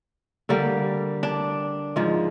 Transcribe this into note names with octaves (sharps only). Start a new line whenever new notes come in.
D3 G3 A#3
D4
G#2 F3 G#3